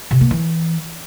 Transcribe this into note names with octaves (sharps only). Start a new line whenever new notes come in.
C3
A#3
E3